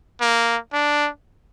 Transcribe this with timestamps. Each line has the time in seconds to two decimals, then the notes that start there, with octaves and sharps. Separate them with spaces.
0.21 A#3
0.73 D4